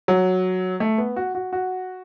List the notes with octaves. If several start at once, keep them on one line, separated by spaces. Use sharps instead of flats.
F#3
A3
B3
F#4
F#4
F#4